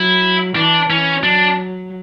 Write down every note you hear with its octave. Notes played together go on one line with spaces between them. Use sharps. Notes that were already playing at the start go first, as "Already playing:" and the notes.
Already playing: F#3 E4
E3 D4
E3 C#4
F#3 D4